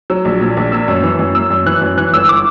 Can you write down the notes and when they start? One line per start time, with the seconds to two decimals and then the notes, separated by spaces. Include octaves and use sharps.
0.10 F#3 E6
0.25 A#1
0.41 A#2
0.57 A#1
0.72 A#3 E6
0.88 F#2
1.03 E3
1.19 F#2
1.35 A#3 E6
1.50 F#2
1.66 E3 F#6
1.82 F#2
1.97 E3 F#6
2.13 G1 E6
2.29 D6